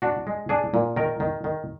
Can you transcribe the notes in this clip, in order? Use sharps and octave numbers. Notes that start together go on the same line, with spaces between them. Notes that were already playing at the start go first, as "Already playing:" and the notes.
D4 F#4
G#3
D4 G#4
A#2
D#3 A#4
D#3
D#3